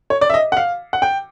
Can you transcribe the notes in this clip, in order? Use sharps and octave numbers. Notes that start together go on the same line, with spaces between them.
C#5
D5
E5
D#5
F#5
F5
F#5
G5